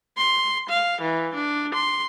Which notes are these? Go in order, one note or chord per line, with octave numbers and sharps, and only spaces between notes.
C6
F5
E3
D4
C6